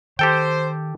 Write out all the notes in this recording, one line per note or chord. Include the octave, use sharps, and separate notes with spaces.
D#3 G4 A4 C5 G5